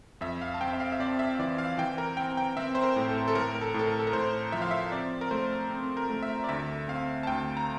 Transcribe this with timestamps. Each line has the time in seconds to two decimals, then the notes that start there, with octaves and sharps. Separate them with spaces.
0.21 F2 E5
0.41 F5
0.54 A5
0.61 C4 G5
0.73 E5
0.80 F5
0.92 E5
1.00 C4 D5
1.19 E5
1.35 E5
1.39 E3 D5
1.58 F5
1.78 E3 G5
1.98 A#4
2.17 C4 G5
2.37 G5
2.57 C4 E5
2.75 C5
2.84 A#4
2.96 A2
3.09 A4
3.28 A4
3.35 A2 A#4
3.55 A#4
3.61 A4
3.74 A2 A4
3.87 A#4
3.99 A4
4.07 A#4
4.13 A2 C5
4.52 F3 E5
4.62 F5
4.71 E5
4.92 C4 D5
5.21 A#4
5.31 A3 C5
5.70 C4
5.97 A#4
6.10 A3
6.23 E5
6.44 D5
6.49 D2 E5
6.88 C4 F5
7.23 A5
7.27 D2 G5
7.57 A#5